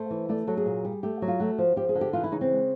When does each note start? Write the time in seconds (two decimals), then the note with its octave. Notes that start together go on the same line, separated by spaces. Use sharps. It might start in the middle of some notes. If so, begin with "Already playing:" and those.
Already playing: A3 C5
0.10 E3
0.29 A3 D5
0.47 F#3 A4
0.57 G#4
0.66 A#2
0.85 G3
1.03 A3 G4
1.22 F#3
1.28 F4
1.40 A3 F#4
1.58 F3
1.76 F3 G4
1.89 G#4
1.95 D3
2.01 G4
2.13 E3 F4
2.24 E4
2.32 C#3 D#4
2.41 C4
2.51 G#3